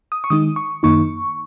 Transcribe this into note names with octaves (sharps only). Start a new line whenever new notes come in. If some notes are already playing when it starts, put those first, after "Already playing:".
D#6
C#6
D#3 G#3 D#4 D#6
C#6
F#2 D#3 A#3 D#4 C#6